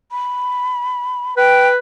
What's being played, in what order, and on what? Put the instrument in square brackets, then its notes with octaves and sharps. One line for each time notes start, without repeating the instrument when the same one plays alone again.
[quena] B5
[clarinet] B4 [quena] G5